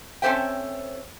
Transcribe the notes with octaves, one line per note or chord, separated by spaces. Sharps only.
C4 C#4 A4 C5 E5 G5